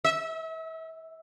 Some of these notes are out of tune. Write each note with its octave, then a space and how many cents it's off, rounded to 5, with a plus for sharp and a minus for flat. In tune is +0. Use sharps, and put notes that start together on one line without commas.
E5 -35